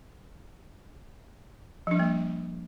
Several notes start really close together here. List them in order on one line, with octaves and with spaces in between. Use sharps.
F3 D4 G3 A#3